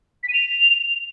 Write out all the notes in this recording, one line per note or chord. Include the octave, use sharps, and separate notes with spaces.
B6
D#7
F7